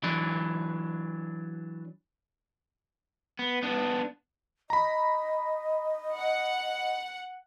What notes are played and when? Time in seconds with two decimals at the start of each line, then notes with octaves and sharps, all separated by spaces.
0.03 E3 F#3 D4
3.39 B3
3.63 B3 D4
4.70 D#5 A#5 B5
6.16 F#5